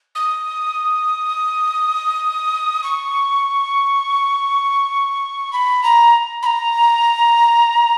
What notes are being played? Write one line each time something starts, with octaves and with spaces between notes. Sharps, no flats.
D#6
C#6
B5
A#5
B5
A#5